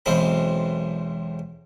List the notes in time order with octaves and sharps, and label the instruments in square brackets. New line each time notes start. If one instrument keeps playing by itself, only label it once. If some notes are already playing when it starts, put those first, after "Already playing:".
[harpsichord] B1 E2 G#3 C4 B5